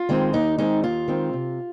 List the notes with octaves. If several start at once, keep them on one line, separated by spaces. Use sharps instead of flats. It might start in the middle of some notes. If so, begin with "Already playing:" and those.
Already playing: F4
D#3 G#3 C4
D#2 D#4
D#3 G#3 C4 D#4
D#2 F4
D#3 G#3 C4
C3